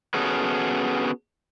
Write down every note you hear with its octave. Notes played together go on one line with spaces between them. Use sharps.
B3 C#4 F#4 G#4 A4